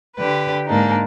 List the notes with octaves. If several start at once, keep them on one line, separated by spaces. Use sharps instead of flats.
D3 G4 B4
G#2 A#3 D4 D#4